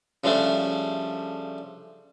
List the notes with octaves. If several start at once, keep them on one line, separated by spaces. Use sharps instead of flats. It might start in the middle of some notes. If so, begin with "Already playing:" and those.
C#3 F3 G3 A3 D4